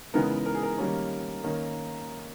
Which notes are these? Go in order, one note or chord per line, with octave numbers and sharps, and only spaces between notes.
C#3 E3 G#3 B3 D#4 A#4
A#4
G#4
A#4
D#3 G3 A#3 C#4
D#3 A#3 C#4